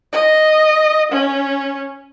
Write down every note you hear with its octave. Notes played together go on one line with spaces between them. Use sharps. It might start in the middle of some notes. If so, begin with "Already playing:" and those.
D#5
C#4